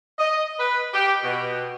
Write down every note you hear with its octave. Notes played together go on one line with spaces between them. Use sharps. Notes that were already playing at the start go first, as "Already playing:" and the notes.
D#5
B4
G4
B2